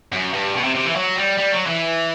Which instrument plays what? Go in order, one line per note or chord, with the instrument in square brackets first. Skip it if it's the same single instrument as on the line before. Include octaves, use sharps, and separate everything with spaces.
[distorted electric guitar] F#2
G2
B2
C3
C3
E3
F#3
G3
G3
F#3
E3